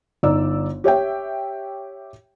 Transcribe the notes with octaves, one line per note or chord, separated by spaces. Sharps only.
G1 D#4 D5 E6
G4 C#5 E5 G5